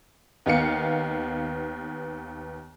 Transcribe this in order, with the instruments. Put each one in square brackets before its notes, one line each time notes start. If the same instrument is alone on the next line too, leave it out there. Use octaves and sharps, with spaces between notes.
[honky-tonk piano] D#2 B3 F5 C#7